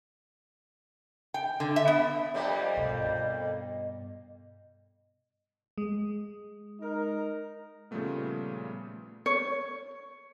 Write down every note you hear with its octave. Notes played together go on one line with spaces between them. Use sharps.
G5
D3
E5
B3
F2 G3 A#3 D#5
G2 B2
G#3
D#4 A#4
A#2 C#3 F3 G3 A3 B3
C#5